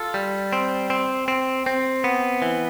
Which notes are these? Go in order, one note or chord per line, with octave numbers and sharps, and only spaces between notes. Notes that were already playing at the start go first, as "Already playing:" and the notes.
Already playing: F4 A4
G3
C4
C4
C4
C4
B3
E3